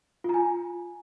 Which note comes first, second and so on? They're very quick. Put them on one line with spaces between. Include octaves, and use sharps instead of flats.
F4 A#5 G#5